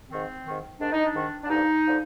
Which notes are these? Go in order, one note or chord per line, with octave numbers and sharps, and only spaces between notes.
G#2 D#3 C4
G#2 D#3
G#2 D#3 D4
D#4
D4
G#2 D#3
D4
G2 D3 F3 D#4
D3 F3